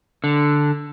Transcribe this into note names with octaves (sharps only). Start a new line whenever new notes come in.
D3